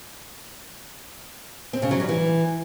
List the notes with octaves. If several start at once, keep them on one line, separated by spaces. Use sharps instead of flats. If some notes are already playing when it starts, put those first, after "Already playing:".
C4
C#3
F#3
G3
E3